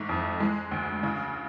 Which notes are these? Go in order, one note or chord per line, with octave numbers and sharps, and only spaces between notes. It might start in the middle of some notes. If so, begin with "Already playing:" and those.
Already playing: G#2 A3
F2
G#3
D2
C#3